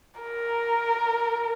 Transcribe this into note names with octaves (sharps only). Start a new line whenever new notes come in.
A#4